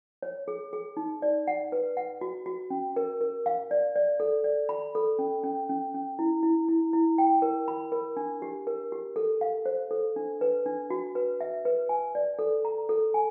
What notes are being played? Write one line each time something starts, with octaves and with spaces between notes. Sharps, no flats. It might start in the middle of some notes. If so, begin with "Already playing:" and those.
C#5
G#4
G#4
D#4
D5
F#5
B4
F#5
F#4
F#4
C#4
A#4
A#4
F5
D5
D5
A4
D5
B5
A4
C#4
C#4
C#4
C#4
E4
E4
E4
E4
G5
A#4
B5
A#4
D4
G4
A#4
G4
A4
F5
C5
A4
D4
B4
D4
F#4
B4
E5
B4
G#5
D5
A4
A#5
A4
G#5